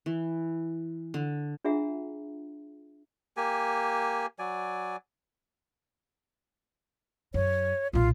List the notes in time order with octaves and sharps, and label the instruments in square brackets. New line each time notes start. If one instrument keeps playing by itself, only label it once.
[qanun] E3
D3
[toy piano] D4 F4 G#4 E5 F#5 A#5
[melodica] A#3 G4 G#5
F#3 D5 G#5
[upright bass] F#2 [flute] C#5
[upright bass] B1 A#2 [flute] F4